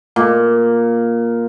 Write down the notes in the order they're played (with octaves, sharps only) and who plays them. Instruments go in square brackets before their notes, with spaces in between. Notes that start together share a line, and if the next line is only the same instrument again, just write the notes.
[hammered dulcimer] A#2